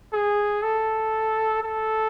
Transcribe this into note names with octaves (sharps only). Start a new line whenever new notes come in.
G#4
A4
A4